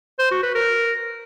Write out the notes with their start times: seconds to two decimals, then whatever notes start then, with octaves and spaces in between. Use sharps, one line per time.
0.19 C5
0.31 F#4
0.43 B4
0.55 A#4